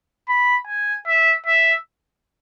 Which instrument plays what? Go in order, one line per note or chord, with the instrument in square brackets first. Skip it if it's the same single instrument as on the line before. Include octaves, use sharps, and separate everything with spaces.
[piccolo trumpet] B5
G#5
E5
E5